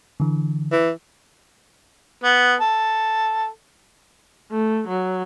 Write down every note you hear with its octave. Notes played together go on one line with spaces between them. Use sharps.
D3 E3
E3
B3
A4
A3
F#3